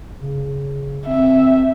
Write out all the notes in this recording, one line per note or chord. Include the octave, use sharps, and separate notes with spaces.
C#3
C4 E5